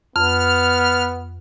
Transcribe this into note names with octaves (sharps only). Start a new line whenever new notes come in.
F2 B3 F6